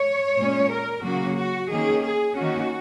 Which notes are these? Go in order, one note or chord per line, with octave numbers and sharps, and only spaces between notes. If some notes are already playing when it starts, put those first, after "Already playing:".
Already playing: C#5
A#2 G#3 C#4
A#4
C#3 F#3 A#3 F#4
F#4
D#3 A#3 C#4 G#4
G#4
D#3 A#3 C#4 F#4